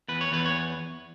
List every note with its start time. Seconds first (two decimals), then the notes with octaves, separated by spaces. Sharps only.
0.08 E2 B4
0.21 C#5
0.32 E2 B4
0.46 C#5